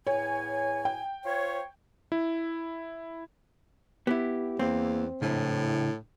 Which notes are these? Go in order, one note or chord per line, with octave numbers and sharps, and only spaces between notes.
E2 A2 C#5 G#5
G5
F4 C5 C#5
E4
B3 E4 G4
E2 A#3 C4
A2 C#3 D4 E4